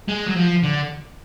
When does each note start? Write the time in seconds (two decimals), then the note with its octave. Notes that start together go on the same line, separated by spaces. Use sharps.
0.08 G#3
0.26 F#3
0.35 F3
0.63 D3